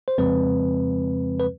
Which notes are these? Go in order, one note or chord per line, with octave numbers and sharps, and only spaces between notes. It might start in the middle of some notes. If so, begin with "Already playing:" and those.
C5
F2 C#3 F3 G#3 C4 B4
B4